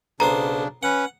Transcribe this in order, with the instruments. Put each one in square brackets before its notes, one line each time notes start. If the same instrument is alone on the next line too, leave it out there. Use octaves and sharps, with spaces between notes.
[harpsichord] B1 B3 C5 [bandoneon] C#3 D4 [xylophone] A#5
[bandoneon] C#4 B4 [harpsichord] F#5